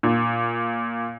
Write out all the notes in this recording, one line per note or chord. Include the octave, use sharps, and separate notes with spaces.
A#2